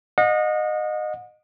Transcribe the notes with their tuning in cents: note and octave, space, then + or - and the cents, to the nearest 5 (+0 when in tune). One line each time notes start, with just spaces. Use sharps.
D#5 -20 F#5 -40